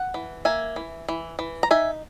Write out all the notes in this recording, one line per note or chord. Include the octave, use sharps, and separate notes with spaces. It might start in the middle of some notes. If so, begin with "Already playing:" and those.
Already playing: F#5
E3
A#3 E5 G#5
E3
E3
E3
A#5
D#4 E5 G#5